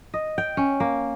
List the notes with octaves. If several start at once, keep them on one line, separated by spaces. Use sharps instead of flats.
D#5
G5
C#4
A#3